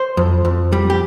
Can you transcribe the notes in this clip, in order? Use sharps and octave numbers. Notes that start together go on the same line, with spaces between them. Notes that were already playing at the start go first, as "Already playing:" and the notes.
Already playing: C5
F2
F2
G3
G4